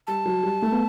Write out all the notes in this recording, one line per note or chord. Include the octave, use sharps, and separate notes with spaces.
G3 A5
F#3
G3
A3
B3